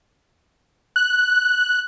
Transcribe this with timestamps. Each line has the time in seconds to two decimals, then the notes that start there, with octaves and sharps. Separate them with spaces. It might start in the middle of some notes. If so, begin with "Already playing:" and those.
0.96 F#6